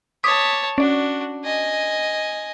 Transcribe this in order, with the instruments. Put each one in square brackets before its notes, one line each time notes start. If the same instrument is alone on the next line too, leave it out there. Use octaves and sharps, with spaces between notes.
[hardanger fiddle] C#5 A5 [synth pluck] D6 D#6 B6
[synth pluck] C#4 D5 [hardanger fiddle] D4 F#4
[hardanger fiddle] D#5 G#5